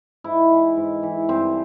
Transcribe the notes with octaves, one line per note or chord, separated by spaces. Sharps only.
G#2 E4
E3
G#2
E3
G2 C4